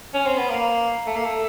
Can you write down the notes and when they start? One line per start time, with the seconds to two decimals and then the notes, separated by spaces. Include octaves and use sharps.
0.14 C#4
0.26 C4
0.37 B3
0.50 A#3
1.07 A3
1.16 A#3
1.25 A3